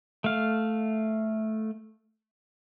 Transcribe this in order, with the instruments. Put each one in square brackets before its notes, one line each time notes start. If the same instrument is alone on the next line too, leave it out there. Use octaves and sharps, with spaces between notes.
[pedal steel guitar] A3 F5